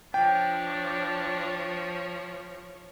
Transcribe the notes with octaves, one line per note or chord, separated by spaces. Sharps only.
F3 D4 C#5 G5